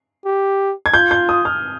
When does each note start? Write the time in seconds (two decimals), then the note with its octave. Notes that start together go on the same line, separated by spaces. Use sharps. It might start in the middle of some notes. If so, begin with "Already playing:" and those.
0.25 G4
0.86 G#6
0.94 F4 G6
1.11 G6
1.29 D#6
1.45 F6